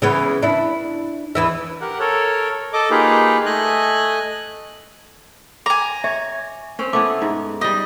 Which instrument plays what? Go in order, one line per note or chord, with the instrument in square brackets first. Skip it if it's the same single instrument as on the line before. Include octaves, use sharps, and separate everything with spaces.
[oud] C#3 E3 B3
D4 E4
E2 E3 E5
[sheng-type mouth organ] G4 A#4 F#5
A4 A#4 C#5
A4 D#5 D6
A#3 D#4 F4 G4 G#4 B4
A3 D#5 G#5 F#6
[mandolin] G#5 A#5 [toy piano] D6
[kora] C#5 [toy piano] E5
[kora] C4 C#4
[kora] A3 B3 E4 [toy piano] D6
[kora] G#2
[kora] G3 G4 [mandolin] D#5